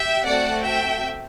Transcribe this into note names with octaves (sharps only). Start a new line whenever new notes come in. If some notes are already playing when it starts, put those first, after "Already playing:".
Already playing: G4 E5 G5
A3 C4 F#4 D5 F#5
E5 G5